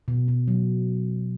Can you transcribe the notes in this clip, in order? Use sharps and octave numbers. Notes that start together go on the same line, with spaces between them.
B2
B2
F#3